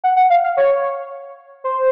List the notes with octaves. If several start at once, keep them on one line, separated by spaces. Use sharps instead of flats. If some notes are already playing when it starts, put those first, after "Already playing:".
F#5
F#5
F5
F5
C#5
C5